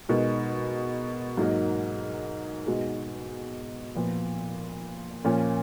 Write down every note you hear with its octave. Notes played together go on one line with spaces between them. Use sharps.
B2 G#3 D#4 A#4
G#2 F#3 A#3 D#4 A#4
B2 G#3 D#4 F#4
A#2 F3 B3
A#2 F3 A#3 C#4